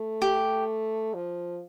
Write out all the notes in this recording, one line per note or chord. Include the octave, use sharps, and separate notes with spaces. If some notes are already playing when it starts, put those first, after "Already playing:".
Already playing: A3
G4
F3